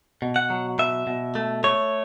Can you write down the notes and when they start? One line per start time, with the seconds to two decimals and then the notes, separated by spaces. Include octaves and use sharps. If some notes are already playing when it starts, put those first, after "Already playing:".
0.22 B2
0.36 F#5
0.50 F#3
0.79 B2 E5
1.07 B2
1.35 A3
1.64 A3 C#5